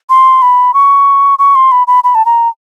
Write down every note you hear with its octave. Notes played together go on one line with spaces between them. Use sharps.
C6
B5
C#6
C#6
C6
B5
B5
B5
A5
A#5